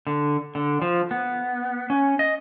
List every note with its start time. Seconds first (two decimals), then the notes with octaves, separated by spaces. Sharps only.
0.07 D3
0.55 D3
0.82 F3
1.11 B3
1.90 C#4
2.19 D#5